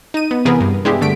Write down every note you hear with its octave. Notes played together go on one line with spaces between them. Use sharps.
D#4 D#7
B3
C3 E3 B3 G#4 A#4 B4
G2
G#3 B3 D4 E4 G4 G#4
G2 D3 A3 B6 D7